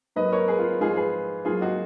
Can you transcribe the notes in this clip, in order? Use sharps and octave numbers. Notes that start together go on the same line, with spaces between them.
G#2 F#3 A#3 B4 D#5
A#4 C#5
G#4 B4
F4
G#2 F3 G#3 F4 G#4
G#4 B4
G#2 F#3 A#3 F4 G#4
D#4 F#4